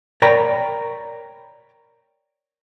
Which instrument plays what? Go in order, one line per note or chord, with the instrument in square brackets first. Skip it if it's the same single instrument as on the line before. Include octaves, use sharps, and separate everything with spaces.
[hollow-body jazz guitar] A#4 C#5 D5 G5 A#5 B5